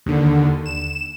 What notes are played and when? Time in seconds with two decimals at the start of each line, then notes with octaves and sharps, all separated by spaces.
0.06 D#2 D3
0.66 E7